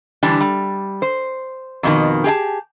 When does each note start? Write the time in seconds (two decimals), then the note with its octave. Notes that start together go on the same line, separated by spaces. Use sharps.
0.23 D3 E3 G3 D4
0.41 G3
1.02 C5
1.83 F2 B2 D#3
2.24 G4 G#4 D#5 A5